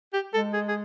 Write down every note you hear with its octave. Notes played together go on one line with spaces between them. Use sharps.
G4
G#3 A4
G#4
G#4